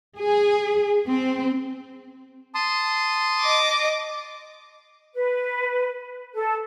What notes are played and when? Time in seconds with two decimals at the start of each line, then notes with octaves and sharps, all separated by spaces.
0.18 G#4
1.07 C4
2.55 A5 C6 D#6
3.41 D#5 D6
5.14 B4
6.34 A4